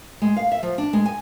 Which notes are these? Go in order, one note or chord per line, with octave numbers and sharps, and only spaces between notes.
G#3
F5
E5
F3
D4
G#3
G#5